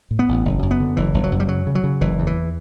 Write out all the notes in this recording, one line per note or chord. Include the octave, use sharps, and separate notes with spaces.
A2
B3
A1
F#1
F#2
B3
D3
F#1 E3
F#1
F#3
F#2
G3
C#3 F#3
C#3
F#3
C#3
F#1 E3
E2
E3